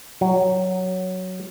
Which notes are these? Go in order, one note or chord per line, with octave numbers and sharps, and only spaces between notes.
F#3